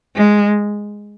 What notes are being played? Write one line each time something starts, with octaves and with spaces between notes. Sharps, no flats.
G#3